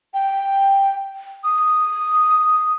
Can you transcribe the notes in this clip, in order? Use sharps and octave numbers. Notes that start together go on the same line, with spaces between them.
G5
D#6